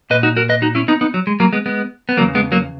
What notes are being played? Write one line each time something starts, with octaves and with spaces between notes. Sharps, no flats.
A#2 B4 D#5
D#4 F#4
F#4 A#4
B4 D#5
D#4 F#4
C#4 E4
B3 D#4
B3 D#4
F#3
G#3
F#3 A#3
G#3 B3
G#3 B3
B3
E2 C#3 E3 F#3 A#3
G#3 B3
F#3 A#3